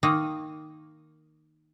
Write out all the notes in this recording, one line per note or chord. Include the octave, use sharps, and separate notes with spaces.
D#3 A#3 D#4